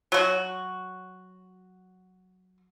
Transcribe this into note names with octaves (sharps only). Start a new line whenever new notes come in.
F#3 F#4